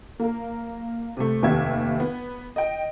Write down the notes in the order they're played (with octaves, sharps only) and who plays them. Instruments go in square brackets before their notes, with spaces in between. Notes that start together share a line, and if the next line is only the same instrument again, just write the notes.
[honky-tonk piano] A#3 A#4
C3 A3
F1 D#2 B3 G4 E5 G#6
B3
D#5 G5